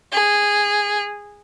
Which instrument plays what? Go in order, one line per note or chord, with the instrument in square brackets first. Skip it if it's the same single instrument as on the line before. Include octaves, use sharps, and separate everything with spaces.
[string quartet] G#4